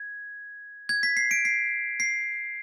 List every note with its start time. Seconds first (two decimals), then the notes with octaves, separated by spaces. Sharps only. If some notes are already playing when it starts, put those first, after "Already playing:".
Already playing: G#6
0.89 G#6
1.03 B6
1.17 C7
1.31 D7
1.45 C7
2.00 C7